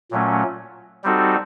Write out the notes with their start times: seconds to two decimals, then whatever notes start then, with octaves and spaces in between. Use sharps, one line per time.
0.11 A#2 F#3 A3 C#4
1.04 G3 C4 D#4 F#4 A4